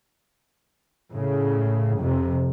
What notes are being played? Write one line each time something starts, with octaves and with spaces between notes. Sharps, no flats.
A2 C#3
F2 C3